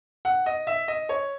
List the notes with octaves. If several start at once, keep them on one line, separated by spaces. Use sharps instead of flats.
F#5
D#5
E5
D#5
C#5